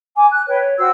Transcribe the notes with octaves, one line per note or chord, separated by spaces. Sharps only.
G#5 D6
F#6
B4 C#5 G5
C#5
F#4 C5 G5 E6